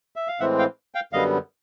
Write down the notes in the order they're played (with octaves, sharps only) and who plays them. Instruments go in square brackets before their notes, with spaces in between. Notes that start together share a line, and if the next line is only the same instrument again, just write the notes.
[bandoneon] E5
F5
A2 E3 G#3 C4 E5 F#5
F5 G5
F5 G5
F#2 D3 G3 B3 D#5 F5